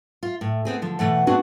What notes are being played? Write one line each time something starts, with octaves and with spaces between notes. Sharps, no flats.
F4
A2
B3 C4 G#4
D3 F3
B2 E3 A3 F#5
A3 B3 C4 D4 F#4 G#4